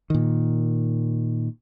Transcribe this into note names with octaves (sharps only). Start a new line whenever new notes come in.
A#2 D#3